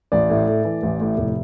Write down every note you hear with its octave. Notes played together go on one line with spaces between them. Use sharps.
A1 D5
A2
A3
E3
A1
A2
F1